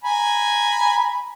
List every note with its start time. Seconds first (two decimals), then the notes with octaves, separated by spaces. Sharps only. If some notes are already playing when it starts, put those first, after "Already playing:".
0.04 G#5 A#5 B5